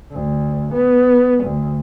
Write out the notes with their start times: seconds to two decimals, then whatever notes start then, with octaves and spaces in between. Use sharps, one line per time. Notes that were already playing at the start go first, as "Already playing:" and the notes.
0.11 D2
0.74 B3
1.44 D2